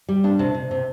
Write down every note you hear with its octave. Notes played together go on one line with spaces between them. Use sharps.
G3
D4
C3 A5
C3
C3